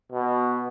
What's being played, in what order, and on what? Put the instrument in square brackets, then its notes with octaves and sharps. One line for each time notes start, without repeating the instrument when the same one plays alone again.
[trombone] B2